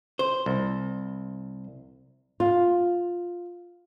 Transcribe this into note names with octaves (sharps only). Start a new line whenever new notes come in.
C5
C2
F4